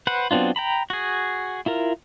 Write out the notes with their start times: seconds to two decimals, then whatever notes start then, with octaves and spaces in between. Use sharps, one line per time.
0.07 B4 C5 F#5
0.31 F#3 B3 C4 D4 F4
0.56 G5 A#5 B5
0.90 F#4 G#4
1.66 E4 F4 A#4